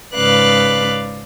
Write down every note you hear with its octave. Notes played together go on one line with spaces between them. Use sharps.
G#2 C#3 B4 D5 F5 F#6